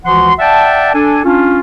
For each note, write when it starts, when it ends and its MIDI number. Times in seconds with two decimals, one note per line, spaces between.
0.05 0.33 37
0.05 0.33 52
0.05 0.33 53
0.05 0.33 66
0.05 0.33 78
0.05 0.33 84
0.39 0.92 74
0.39 0.92 76
0.39 0.92 78
0.39 0.92 79
0.39 0.92 81
0.94 1.20 62
0.94 1.20 69
0.94 1.20 80
1.24 1.60 61
1.24 1.60 62
1.24 1.60 65